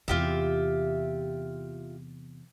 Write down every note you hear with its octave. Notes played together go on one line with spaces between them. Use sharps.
E2 C3 F4 G4 E5